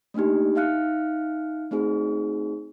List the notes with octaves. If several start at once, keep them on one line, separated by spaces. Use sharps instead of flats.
A3 A#3 D4 D#4 G4
D#4 E5 F5 F6 F#6 C#7
A3 C4 D#4 F#4 G#4